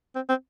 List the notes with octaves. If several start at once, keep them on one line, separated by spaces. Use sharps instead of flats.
C4
C4